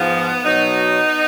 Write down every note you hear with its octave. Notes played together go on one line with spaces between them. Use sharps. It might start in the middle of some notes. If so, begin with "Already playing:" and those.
Already playing: G#2 F3 B3
B2 F#3 B3 D#4